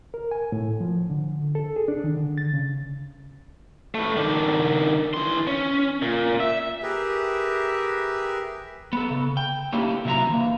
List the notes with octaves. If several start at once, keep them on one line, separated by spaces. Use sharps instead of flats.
A#4
G#5
A2
F3
D3
A4
G#4
D4
D#3
D3
A6
C#3
A3 B4
D#3 D4
E3 C6
C#4
A#2
E5
G4 G#4 A#4 B4 E5
B3 A4
C#3
G5
A3 A#3 C#4 D4 E4 G4
C3 E3 F#3 E4 E5 A#5
E3 A#3